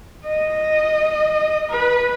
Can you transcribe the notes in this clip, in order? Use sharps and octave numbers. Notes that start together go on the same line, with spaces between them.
D#5
B4